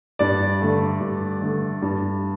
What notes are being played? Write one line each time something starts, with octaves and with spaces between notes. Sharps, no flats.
G2 D5
D3 A3
G2
D3 A3
G2